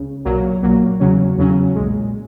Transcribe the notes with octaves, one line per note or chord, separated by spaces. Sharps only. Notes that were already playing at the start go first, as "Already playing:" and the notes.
Already playing: C#2 C#3
B1 A#2 F#3 A#3
B1 A#2 F#3 A#3
E2 C#3 F#3 C#4
E2 C#3 F#3 C#4
B1 A#2 G#3